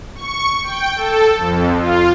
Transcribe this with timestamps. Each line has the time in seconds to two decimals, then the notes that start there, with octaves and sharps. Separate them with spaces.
0.15 C#6
0.63 G5
0.95 A4
1.37 F2
1.77 F4